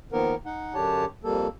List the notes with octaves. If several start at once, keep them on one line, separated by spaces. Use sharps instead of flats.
D#3 F3 A#3 B3 A#4
D#4 F#5
F#2 D3 D4 G4 C#5 A5
F2 G3 A#3 A4